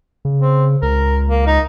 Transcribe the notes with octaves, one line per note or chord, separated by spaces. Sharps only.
C#3
C4
C#2 A#4
A#3
D#4